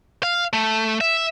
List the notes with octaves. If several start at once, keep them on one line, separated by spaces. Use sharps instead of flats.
F5
A3
E5